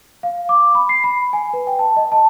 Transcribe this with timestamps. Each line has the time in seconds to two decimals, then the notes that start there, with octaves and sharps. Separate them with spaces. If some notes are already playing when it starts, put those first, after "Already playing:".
0.23 F5
0.49 D6
0.75 B5
0.89 C7
1.04 B5
1.33 G#5
1.53 B4
1.67 G5
1.79 A5
1.97 D#5
2.12 A5